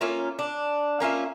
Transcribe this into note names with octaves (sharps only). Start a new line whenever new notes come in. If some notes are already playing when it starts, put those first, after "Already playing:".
A#3 C#4 F4 E5
D4
A#3 C#4 F4 E5